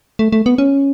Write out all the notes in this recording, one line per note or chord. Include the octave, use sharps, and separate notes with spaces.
A3
A3
B3
C#4